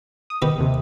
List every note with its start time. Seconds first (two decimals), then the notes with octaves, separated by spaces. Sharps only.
0.30 D#6
0.42 D#3 B3 G4
0.58 D#2 C3